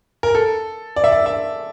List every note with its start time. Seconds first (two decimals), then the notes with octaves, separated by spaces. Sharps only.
0.23 A#4
0.35 A4
0.96 D5
1.04 E5
1.12 D5
1.26 E5